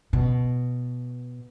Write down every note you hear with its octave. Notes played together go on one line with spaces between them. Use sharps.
B2